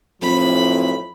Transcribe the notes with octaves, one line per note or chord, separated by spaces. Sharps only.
B1 F2 A2 F3 B5